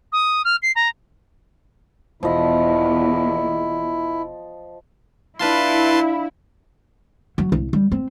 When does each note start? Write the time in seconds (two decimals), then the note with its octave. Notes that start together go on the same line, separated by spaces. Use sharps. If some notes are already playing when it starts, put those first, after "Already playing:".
0.12 D#6
0.45 F6
0.62 C7
0.76 A#5
2.23 E1 E2 F3 E4 D#5
5.39 D4 E4 F4 B4 A5 C6
7.38 F#3
7.52 C2
7.73 G3
7.92 C4